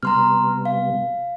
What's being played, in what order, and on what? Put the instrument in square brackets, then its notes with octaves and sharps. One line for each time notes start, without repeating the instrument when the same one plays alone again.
[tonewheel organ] C3 G3 B3 [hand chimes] A#5 C6 F6
[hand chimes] F5